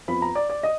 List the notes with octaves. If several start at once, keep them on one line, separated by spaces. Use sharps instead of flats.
F2 F3 B3 F4 B5
A#5
D5
D5
D#5